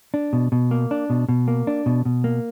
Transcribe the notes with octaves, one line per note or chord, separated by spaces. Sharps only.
D4
B2
B2
A#3
D4
B2
B2
A#3
D4
B2
B2
A#3